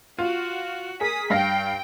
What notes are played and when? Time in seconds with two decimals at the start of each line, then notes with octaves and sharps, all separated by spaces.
0.19 F4 F#4
1.01 G#4 A#4 D#6 B6
1.30 G2 F5 G5 A#6